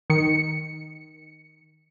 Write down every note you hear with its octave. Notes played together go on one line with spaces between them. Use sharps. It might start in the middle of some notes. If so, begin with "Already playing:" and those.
D#3 C#7